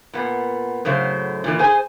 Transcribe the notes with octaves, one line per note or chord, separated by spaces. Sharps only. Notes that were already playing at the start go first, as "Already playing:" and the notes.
A#2 B3
F#2 A2 C#3 C5
A#2 D#3 E3
G#4 C5 G#5